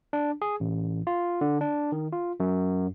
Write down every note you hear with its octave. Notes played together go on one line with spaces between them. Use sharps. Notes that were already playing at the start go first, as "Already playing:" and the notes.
D4
G#4
A1
F4
D3
D4
D#3
F4
F#2